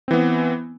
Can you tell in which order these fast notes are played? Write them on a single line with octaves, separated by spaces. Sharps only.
C4 E3 B3